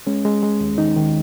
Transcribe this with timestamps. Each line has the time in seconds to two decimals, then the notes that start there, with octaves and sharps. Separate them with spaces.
0.07 G#3 C#4
0.25 G#3
0.43 G#3
0.61 D#2
0.78 D#3 D#4
0.96 D#3